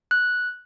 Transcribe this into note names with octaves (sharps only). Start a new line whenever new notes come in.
F#6